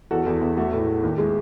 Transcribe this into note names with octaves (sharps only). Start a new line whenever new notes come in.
E2 F#4 A4
E2
E2
A3 F#4 A4
A2
A3
D#2
G#3